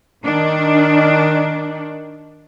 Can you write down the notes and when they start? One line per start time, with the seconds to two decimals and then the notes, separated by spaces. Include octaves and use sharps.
0.24 D#3 D4